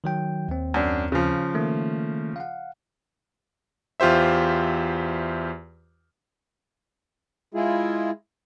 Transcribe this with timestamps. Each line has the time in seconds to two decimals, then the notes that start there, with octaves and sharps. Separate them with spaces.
0.04 D#3 F#3 G5
0.48 D#2 C4
0.74 F#2 D4
1.12 C#3 F3
1.54 D#3 A3 A#3
2.36 F5 F#5
4.00 E2 F4 G4 C5 E5
7.54 G#3 E4 F4 G#4